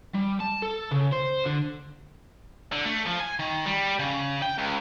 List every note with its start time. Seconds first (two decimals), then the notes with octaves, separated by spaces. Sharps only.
0.15 G3
0.40 A5
0.62 A4
0.92 C#3
1.13 C5
1.45 D3
2.72 D3
2.85 A3
3.07 F3
3.20 G#5
3.39 D#3
3.66 G3
3.99 C#3
4.42 G5
4.58 C#2